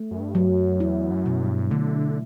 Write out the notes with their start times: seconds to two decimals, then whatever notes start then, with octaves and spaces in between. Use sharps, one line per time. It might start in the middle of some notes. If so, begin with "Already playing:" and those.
Already playing: A3
0.11 F#2
0.20 G2
0.35 F#3
0.50 F#2
0.80 E2 E4
1.10 F#2
1.26 B2
1.41 G2
1.71 D3 A3